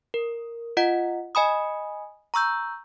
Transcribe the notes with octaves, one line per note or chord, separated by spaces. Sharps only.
A#4
F4 D#5 F#5
D#5 G#5 B5 D#6
A#5 C#6 E6 G6